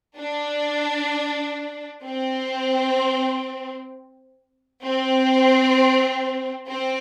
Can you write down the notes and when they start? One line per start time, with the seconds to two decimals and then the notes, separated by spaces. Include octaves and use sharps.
0.18 D4
2.04 C4
4.83 C4
6.69 C4